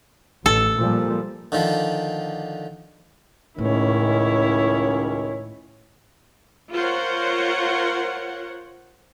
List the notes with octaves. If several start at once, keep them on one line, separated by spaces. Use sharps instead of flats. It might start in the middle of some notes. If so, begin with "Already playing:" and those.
A1 A4
A#2 F3 G3
D3 D#3 F3
C#2 A2 D#3 C#4 E4 C#5
F4 A#4 C5 C#5 F#5